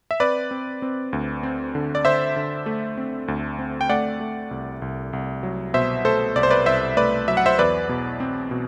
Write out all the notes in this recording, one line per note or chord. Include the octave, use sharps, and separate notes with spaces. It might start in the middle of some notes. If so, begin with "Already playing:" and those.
E5
C4 B4 D5
C4
C4
D2
C4
D3
D5
D3 C5 E5
D3
A3
C4
D2
C4
G5
A3 D5 F#5
A3
C2
C2
C2
F#3
B2 C5 E5
A3 A4 C5
C2 D5
C5
B4 D5
C2 C5 E5
A3 B4 D5
F#3 E5
F#5
C5 E5
E2 B4 D5
B2
C4
B2